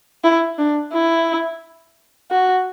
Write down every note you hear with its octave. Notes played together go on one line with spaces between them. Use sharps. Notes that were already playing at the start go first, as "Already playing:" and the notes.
E4
D4
E4
F#4